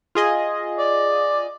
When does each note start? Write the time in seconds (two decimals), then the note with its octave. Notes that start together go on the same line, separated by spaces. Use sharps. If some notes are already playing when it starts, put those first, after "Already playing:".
0.15 F4 G#4 D#5
0.79 D5